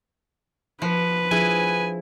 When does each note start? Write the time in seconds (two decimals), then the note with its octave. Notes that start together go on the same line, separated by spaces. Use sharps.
0.82 F3 B4
1.31 F3 D4 E4 G#4 G#5